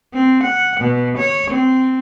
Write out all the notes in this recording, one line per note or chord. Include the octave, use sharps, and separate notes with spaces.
C4
F#5
B2
C#5
C4